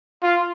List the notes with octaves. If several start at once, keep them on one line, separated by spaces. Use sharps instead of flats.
F4